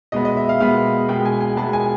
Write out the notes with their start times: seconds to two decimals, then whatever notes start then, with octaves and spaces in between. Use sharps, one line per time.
0.12 B2 G#3 B3 D#5
0.25 D#5
0.37 E5
0.49 F5
0.60 B2 G#3 B3 F5
1.08 B2 G#3 B3 G5
1.25 G#5
1.40 G#5
1.57 B2 G#3 B3 A5
1.73 G#5